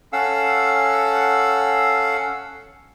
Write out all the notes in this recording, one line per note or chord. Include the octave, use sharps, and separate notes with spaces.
C#4 A4 F5 F#5 E6